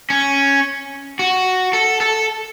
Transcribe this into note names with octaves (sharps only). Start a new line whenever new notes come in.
C#4
F#4
A4
A4